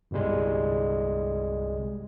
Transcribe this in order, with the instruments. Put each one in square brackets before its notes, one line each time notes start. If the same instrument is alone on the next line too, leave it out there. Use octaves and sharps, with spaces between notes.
[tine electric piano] G1 C2 G3 G#3